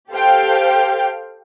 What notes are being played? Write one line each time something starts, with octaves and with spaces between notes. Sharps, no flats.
G4 A4 C5 F5 G5